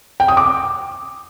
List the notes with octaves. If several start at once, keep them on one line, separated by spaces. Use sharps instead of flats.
G5
D#6
D6